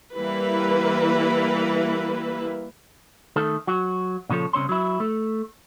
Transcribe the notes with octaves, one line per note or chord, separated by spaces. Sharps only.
E3 G3 A#3 E4 B4
D#3 A3 A4
F#3 F#4
A#2 C#3 F3 A4 C#5
C2 C#3 C4 C#5 C6
F#3 E4
A3